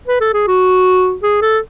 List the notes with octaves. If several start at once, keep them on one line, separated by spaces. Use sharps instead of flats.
B4
A4
G#4
F#4
G#4
A4